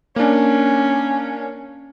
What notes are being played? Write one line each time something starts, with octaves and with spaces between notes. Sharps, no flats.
A#3 C#4 D4